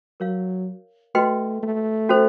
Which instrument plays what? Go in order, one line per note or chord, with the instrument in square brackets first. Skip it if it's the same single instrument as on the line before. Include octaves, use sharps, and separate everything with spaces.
[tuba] F#3 [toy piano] A#4 C#5 F5
[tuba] A3 [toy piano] F#4 B4 D#5 G5 C6
[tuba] A3
[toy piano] C#4 F#4 A4 C5